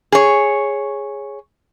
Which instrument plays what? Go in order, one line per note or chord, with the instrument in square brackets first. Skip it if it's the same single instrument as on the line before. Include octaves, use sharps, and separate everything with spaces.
[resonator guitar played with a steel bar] G#4 C#5